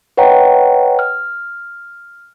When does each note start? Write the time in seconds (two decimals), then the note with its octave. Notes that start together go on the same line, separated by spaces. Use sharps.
0.17 B4 C#5 D#5 F#5 G5 A#5
0.99 F6